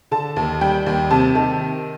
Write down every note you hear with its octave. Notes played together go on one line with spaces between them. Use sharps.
D3 A5
D#2
G3 G5
D#2
C3 A5
D#3